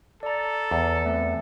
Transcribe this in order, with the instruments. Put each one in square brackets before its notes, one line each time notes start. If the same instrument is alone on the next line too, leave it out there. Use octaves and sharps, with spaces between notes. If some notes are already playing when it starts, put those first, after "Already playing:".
[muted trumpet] A4 [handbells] D5 A#5
[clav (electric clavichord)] E2
[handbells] A3 C4